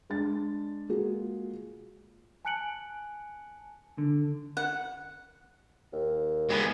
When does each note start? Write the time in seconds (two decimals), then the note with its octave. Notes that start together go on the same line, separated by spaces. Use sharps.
0.10 G#3 D4 A6
0.89 G#3 A#3 F4 F#4 G#4
2.45 G#5 A5 F#6 C#7 D7 F#7
3.98 D3
4.57 F#5
5.93 D#2
6.50 G#3 B3